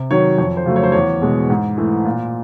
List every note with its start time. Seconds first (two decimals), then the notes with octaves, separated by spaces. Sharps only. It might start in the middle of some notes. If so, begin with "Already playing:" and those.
Already playing: C3
0.11 D#3 F#3 C#5
0.38 F2 C#5
0.57 C5
0.66 C#3 F#3 A3
0.76 C#5
0.83 C5
0.92 E2 C#5
1.22 B2 G#3
1.50 G#2
1.78 E3 A3
2.05 A#2